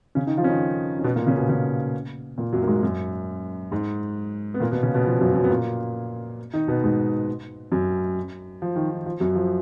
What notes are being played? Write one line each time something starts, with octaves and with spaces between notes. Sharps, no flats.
C#3 C#4
D#3 D#4
F3 F4
C#4
D#3 D#4
C#4
B2 B3
A#2 A#3
C#3 C#4
B2 B3
C#3 C#4
A#2 A#3
F#2 F#3
A#3
G#2 G#3
F#2 F#3
G#2 G#3
B3
A#2 A#3
B2 B3
C#3 C#4
B2 B3
F3
F#2 F#3
F#2 F#3
B3
A#2 A#3
D#3 D#4
B2 B3
G#2 G#3
F#2 F#3
F3
D#3
D#3
F3
F#2 F#3
F3